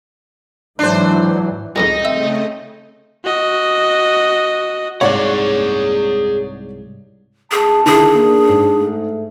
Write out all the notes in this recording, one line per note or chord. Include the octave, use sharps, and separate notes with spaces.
G#2 E3 F#3 D4 C5
C2 F2 G#2 D#4 A#6
C#3 A3 C4 D#5 E5
F#4 D#5
C2 G#2 G#4 C#5 D5 F#5
C#2 G2 G#4 A5
D3 D#3 E4 G#4
A#3 D4
G#2
A3